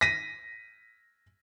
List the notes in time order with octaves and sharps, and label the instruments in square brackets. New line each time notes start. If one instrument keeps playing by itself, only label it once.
[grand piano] A#6 B6 D#7